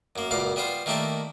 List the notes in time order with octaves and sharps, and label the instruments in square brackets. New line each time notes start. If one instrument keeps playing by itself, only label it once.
[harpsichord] F#2 A#3
C#2 F#2 A#2 F5 D6
G3 B3 F4 C5
D#3 A3 A#3 E4 G4 D5